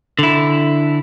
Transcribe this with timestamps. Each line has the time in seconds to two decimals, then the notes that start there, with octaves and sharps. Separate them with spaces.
0.19 D3 E4